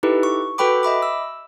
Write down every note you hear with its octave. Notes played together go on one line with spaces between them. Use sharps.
D#4 E4 G4 A4 B4
C#6
F#4 A4 B4 G5 B5 D6
D#5 E5 B5 D6
E6